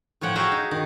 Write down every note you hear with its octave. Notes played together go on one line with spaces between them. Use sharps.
A2 F3 C#5 F#5 G5
F#4 G#4 E5 F5 G5 A#5
D#4
D#3